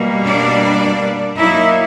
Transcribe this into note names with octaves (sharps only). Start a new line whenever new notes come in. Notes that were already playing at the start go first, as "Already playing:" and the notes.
Already playing: B2 G3 A#3
D4 D5
F#3 A#3 D#4 E4 E5